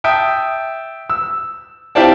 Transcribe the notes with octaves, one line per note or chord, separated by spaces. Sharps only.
E5 G5 A5 D#6
E6
C4 E4 F4 G4 D5 A5